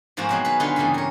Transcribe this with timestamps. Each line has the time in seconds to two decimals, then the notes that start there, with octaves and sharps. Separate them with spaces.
0.17 G#2 F3 A#3 C4 F#4
0.29 B2 F#3 G#3
0.45 D#3 B4
0.60 D3 D#4 F4 G4 G#4 B4
0.76 G2 A#2 C#3 E3 A3
0.94 A#4 C#5